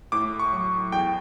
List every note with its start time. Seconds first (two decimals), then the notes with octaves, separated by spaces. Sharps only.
0.12 A2 D6
0.40 C#6
0.53 F#3
0.92 E2 G5